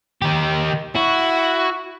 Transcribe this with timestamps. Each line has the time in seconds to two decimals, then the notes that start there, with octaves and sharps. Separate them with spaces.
0.22 D#3 G4
0.96 E4 F#4